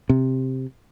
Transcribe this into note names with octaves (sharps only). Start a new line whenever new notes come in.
C3